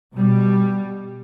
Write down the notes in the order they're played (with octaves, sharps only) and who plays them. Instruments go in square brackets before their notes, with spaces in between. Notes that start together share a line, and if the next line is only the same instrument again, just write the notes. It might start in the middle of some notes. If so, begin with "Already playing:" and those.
[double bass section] B2 G3